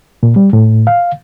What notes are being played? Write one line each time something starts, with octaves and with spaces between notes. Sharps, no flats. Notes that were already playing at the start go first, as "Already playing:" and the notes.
A#2
G3
A2
F5